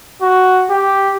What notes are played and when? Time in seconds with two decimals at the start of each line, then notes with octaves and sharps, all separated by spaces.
0.22 F#4
0.70 G4